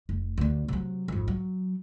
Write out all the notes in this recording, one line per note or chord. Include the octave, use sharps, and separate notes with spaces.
F1
D2 D4
C3 F#3
G#1 F2
F#3